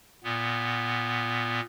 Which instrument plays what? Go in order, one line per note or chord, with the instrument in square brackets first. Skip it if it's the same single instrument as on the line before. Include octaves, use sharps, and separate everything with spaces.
[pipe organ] A#2 B3